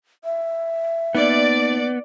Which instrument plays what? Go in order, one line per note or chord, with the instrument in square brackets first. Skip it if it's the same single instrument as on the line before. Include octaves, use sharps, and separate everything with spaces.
[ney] E5
[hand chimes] A#3 D#4 [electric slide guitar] B3 [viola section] D5